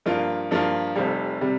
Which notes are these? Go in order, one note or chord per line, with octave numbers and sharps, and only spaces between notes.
G2 F3 A#3 F4
G2 F3 A#3 F4
F1 F2 C3 G3
C3 G3